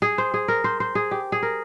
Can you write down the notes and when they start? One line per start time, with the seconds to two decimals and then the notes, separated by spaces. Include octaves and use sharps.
0.02 G#4
0.18 C5
0.34 G#4
0.48 A#4
0.64 C5
0.80 C5
0.95 G#4
1.11 G4
1.32 G#4
1.43 A#4